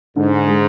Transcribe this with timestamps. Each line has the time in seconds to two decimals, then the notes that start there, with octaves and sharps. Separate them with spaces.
0.16 G#2 D3
0.48 G#3